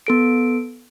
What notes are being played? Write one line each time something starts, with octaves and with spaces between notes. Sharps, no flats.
B3 A4 D7